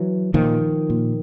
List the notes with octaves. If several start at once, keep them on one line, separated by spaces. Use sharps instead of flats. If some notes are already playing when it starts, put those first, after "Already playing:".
Already playing: E3 F#3
A#2 D#3 F3
A#2